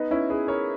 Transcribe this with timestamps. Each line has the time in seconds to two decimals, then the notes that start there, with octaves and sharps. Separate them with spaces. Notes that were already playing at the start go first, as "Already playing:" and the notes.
Already playing: B3 D#4
0.11 C#4 E4
0.29 G#4 B4
0.47 A#4 C#5